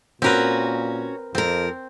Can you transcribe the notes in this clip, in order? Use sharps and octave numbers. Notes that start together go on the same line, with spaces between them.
A#2 C4 C#4 F#4 A#4 B4
F2 F3 C4 A#4